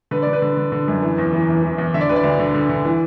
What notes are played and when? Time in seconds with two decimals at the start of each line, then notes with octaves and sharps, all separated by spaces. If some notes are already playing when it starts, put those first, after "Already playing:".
0.11 D3 B4
0.22 D3 D5
0.33 B4
0.42 D3
0.57 D3
0.72 D3
0.88 F#2
1.02 E3
1.18 E2
1.33 E3
1.48 E2
1.63 E3
1.78 E2
1.94 D3 E5
2.01 D5
2.09 D2 B4
2.16 D5
2.24 D2
2.39 D3
2.54 D3
2.69 D3
2.85 E3